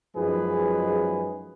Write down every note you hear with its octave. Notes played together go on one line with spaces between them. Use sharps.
F#2 F3 G#3 D#4 G#4 B4